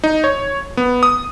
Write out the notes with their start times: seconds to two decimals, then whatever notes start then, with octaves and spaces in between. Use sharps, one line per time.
0.04 D#4
0.24 C#5
0.77 B3
1.03 D#6